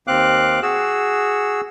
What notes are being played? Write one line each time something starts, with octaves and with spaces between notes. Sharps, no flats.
D#2 C4 F5 D6 F#6
F#4 G#4 E6